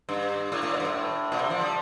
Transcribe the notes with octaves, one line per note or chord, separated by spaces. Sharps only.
G2
A2
A2
A#2
G2
A2
A#2
C3
F3
G3